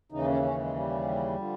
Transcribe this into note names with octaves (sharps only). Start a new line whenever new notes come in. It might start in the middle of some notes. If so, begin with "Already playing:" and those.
D#2 C#3 E3 D#4
C#4
C#4
G#3
G3
D3 F3